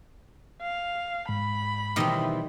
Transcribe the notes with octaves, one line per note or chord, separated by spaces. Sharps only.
F5
G#2 B5
B2 D#3 E3 G3 C4 D#5